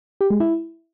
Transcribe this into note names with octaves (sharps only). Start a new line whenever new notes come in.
G4
G#3
E4